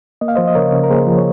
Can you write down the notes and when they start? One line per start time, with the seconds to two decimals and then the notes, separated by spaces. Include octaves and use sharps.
0.21 A#3 D#5
0.28 F5
0.35 F3 C5 D#5
0.47 D#5
0.55 C#3 A#4 C#5
0.72 C#3
0.83 A#4
0.90 A#3 G#4 C5
1.07 F3
1.18 C#5